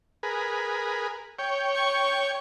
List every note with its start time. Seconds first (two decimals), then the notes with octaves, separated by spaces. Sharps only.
0.23 G#4 A#4 B4
1.39 C#5 G5
1.75 C#6